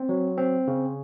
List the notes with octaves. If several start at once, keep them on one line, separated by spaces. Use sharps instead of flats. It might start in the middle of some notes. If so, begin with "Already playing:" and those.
Already playing: C4
F#3
C4
C#3